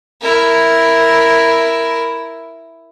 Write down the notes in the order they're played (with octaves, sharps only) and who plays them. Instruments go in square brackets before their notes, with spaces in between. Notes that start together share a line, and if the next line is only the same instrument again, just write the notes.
[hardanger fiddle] E4 A#4